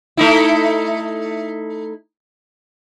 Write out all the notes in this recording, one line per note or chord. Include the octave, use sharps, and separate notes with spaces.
A3 D#4 E4